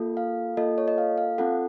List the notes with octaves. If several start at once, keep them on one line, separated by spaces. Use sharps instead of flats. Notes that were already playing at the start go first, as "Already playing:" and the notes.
Already playing: A#3 F4 A4
F5
A#3 F4 A4 D#5
C#5
D#5
F5
F5
C4 F4 A4 F#5